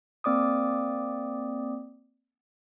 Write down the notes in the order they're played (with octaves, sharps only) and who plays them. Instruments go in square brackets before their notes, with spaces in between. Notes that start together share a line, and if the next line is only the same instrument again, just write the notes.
[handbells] A#3 C4 D5 D6 D#6